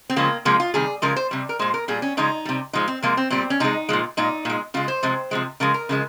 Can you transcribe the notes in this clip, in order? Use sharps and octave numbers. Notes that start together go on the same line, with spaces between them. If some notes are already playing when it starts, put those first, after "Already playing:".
C4
C#3 F3 G#3 A#3
C3 F3 G#3 A#3
F4
C3 D#3 G3 G#4
C#3 F3 G#3 A#4
C5
C3 G3
A#4
A#2 G#3 C5
A#4
A#2 G3 G#4
C#4
C#3 F3 G#3 D#4
C3 G3
A#2 F3 G#3 D#4
C4
C3 F3 G#3 A#3
C4
A#2 G3 C4
C#4
C3 F3 G#3 D#4
A#2 F3 G#3
A#2 G#3 D#4
A#2 G#3
C#3 G#3 F4
C5
C3 F3 G#3
C3 F3 G#3
C#3 F3 G#3 A#4
A#4
C#3 F3 G#3